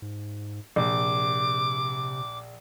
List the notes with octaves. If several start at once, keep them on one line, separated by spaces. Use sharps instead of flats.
G#2
A#1 C3 D6